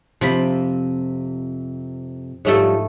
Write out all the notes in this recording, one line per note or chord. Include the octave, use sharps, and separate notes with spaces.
F2 A2 C3 F3 B5
G#2 F3 G3 A3 A4 C#5